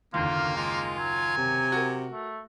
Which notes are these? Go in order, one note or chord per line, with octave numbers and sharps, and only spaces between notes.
F#1 D#2 D3 A#3 F4
G#3 F4
F#3 G#5
C3
F#4 A#4
A3